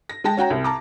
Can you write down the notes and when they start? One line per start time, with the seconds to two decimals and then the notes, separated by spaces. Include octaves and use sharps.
0.09 A#6
0.24 G#3 G5 A5 A#6
0.37 C#4 F#4 G5 A#5
0.50 C2
0.64 A5 A#5 D6